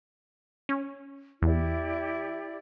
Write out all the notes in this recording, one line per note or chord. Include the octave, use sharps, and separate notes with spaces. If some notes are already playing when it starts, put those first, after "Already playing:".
C#4
E2 E4 G4 D5